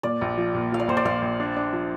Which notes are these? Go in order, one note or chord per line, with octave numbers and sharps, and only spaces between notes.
A#2 D5
A#1
F3
A#2
F3 F5
D5
A#1 C5
D5
A#1 F5
A#1
D4
D4
F3